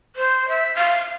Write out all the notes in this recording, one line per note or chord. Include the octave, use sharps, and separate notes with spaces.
C5
E5
F5